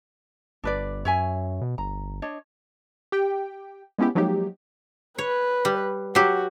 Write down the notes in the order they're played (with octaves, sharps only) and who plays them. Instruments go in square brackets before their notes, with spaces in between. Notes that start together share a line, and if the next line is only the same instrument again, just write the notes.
[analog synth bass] G1 [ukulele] D4 B4 D5
[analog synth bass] F#2 [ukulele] C#5 E5 G#5
[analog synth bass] B2
[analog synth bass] G1 [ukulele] A#5
[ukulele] D4 C#5 D#5
[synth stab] G4 G5
G#3 B3 C#4 E4 G4
F3 F#3 G#3 A#3 D#4 G4
[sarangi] B4 [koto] C#5
[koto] G3
[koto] F#3 G4 [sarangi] F#4